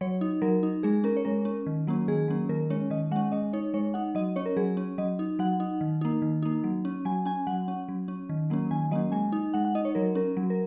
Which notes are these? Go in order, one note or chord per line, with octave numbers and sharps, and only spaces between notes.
F#3 C#5
D#4
F#3 A#4
D#4
G#3 G#4
C#4 A#4
C#5
G#3 A#4
C#4
D#3
F#3 A#3 C#4
D#3 G#4
F#3 A#3 C#4
D#3 A#4
G#3 C#4 C#5
D#3 D#5
G#3 C#4 F#5
G#3 D#5
D#4 C#5
G#3 C#5
D#4 F#5
F#3 D#5
C#4 C#5
A#4
F#3 G#4
C#4
F#3 D#5
D#4
F#3 F#5
D#4
D#3
A#3 D#4
D#3
A#3 D#4
F#3
C#4
F#3 G#5
C#4 G#5
F#3 F#5
C#4
F#3
C#4
D#3
F#3 A#3 C#4
D#3 G#5
F#3 A#3 C#4 D#5
G#3 G#5
D#4
G#3 F#5
F#5
D#4 D#5
C#5
F#3 A#4
C#4 A#4
F#3
A#4